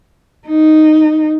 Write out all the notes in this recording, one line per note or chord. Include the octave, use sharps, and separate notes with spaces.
D#4